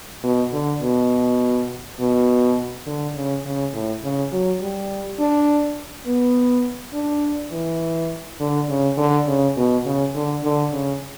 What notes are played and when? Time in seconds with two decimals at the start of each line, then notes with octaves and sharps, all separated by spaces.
0.23 B2
0.53 D3
0.82 B2
1.99 B2
2.87 D3
3.15 C#3
3.45 C#3
3.73 A2
4.03 C#3
4.32 F#3
4.61 G3
5.19 D4
6.06 B3
6.93 D4
7.52 E3
8.40 D3
8.68 C#3
8.97 D3
9.26 C#3
9.57 B2
9.85 C#3
10.15 D3
10.43 D3
10.72 C#3